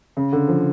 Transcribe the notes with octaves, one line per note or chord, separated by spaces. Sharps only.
C#3
D3
F3